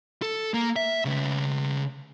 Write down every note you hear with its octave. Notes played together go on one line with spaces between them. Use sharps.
A4
A#3
E5
C#3 B4